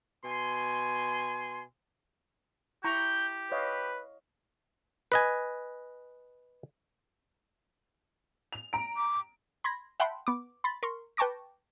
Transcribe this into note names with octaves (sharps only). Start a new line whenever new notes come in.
B2 G#5 C6
E4 G4 A#5 C#6 G6
B4 C#5 D#5 F5
B4 D#5 G#5
F7
A#5 D7
D6
B5 C6 G#6 A#6
E5 F#5 G5 A5 B5 C6
B3 D6
B5 C6 A6
A#4 C6 C#6
B4 G5 A5 C#6 D6 A#6